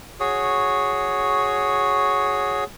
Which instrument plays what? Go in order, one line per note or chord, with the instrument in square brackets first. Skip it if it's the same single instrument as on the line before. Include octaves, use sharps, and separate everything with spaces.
[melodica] F#4 G#4 C#5